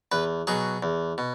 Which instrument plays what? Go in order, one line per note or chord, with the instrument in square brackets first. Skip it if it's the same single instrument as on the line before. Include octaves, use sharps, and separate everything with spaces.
[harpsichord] E2 B4
B2 F#3 G#4
E2
B2